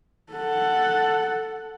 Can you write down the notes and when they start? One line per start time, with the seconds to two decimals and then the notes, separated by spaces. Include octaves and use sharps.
0.33 A4 F#5